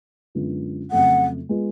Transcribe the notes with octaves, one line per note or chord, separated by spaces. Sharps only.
F#2 D3 G#3 B3 F4
F2 C#3 F#3 A3 F#5
G#3 B3 F4